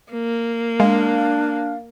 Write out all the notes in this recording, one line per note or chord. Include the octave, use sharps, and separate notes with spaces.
A#3
G#3 D4 F5